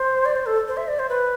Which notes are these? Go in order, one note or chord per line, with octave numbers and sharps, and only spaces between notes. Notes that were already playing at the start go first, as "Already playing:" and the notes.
Already playing: C5
D5
C5
A4
C5
E5
D5
C5
B4